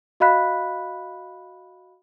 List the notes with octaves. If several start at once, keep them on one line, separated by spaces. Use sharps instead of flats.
F#4 D#5 F5 B5 F#6 B6